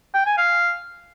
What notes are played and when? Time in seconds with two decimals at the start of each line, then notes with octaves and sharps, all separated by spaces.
0.14 G5
0.26 G#5
0.38 F5